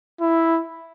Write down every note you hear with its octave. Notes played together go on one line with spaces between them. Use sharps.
E4